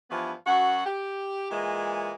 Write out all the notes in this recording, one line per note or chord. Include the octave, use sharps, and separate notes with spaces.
G2 E3 F3 B3
F#2 F#4 F#5
G4
A#2 E3 G#3